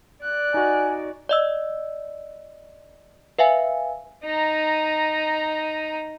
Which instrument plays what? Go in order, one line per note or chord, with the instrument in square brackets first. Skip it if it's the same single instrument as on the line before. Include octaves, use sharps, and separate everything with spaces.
[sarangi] D5 [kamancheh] F#6
[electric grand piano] D#4 F#4 [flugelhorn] G#5
[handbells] D5 D#5 E6
B4 E5 F5 G#5
[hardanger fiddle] D#4 A#5